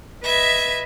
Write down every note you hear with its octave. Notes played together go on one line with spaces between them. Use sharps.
B4 D#5 E5 G#6